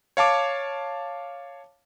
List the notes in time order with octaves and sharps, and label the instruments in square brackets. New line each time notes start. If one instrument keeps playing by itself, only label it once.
[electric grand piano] C#5 F5 A5 D6